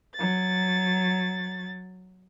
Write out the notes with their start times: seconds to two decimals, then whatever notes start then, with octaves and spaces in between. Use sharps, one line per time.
0.15 F#3 A6